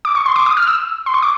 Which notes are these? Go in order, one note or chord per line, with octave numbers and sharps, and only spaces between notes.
D6
C#6
C6
D6
D#6
F6
E6
C6
C#6
D6